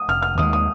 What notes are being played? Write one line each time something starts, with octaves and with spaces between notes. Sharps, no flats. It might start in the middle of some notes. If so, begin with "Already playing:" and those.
Already playing: D#6
F1 F6
F6
D#2 D#3 G#3 D#6
D#6